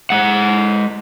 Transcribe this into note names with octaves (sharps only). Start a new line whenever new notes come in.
G#3 F#5